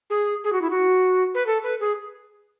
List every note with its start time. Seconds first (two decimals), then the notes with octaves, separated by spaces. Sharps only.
0.10 G#4
0.44 G#4
0.52 F#4
0.62 E4
0.70 F#4
1.34 B4
1.46 A4
1.63 B4
1.80 G#4